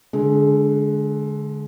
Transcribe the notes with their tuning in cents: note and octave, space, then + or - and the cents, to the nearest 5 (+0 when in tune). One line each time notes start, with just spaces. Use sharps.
D3 -10 G#3 +20